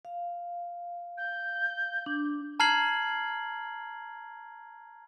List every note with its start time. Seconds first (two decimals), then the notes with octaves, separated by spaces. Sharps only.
0.05 F5
1.17 G6
2.06 D4
2.60 A5 A#5 F6 G#6 C7 F#7